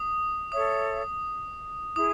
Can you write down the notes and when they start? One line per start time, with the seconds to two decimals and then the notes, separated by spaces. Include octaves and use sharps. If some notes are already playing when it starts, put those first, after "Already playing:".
Already playing: D#6
0.52 A4 C#5 E5 D#6
1.96 E4 G#4 D#6